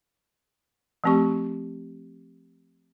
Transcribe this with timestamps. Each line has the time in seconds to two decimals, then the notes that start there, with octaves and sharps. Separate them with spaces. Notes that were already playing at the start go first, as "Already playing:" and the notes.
1.04 F3 A3 C4 G4 C#6